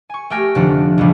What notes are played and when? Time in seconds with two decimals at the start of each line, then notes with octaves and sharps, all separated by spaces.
0.09 G#5 C#6
0.30 A3 G4 G5 G#5 F6 A#6
0.55 F1 D3 F3 D4 F#5 F6
0.98 A#1 D#2 A#2 C#3 F3 G3